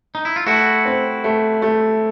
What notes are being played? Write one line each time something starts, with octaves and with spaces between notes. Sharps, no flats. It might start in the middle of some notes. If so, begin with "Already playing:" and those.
D#4
E4
F4
A3 E4 F#4
C4
A3
A3